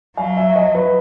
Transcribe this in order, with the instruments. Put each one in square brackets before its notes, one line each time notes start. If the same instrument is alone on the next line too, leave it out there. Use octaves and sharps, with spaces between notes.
[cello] F#3 [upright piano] F5
[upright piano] E5
D#5
B4